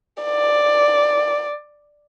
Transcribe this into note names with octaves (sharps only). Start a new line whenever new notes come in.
D5